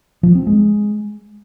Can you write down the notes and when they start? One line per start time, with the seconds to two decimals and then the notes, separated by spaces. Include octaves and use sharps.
0.23 F3
0.35 C4
0.47 G#3